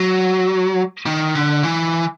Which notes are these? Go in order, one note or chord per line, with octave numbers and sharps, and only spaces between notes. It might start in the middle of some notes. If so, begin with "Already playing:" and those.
Already playing: F#3
D#3
D3
E3